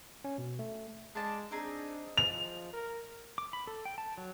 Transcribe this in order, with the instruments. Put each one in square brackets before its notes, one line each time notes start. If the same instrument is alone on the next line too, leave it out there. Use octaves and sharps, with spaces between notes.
[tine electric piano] C#4
B2
A3
[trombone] G#3 [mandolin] D4 A5
[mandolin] C4 D#4 G#4 [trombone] D4
[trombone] F3 [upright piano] F7
[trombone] A#4
[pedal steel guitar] D6
B5
A4
G5
A5
F#3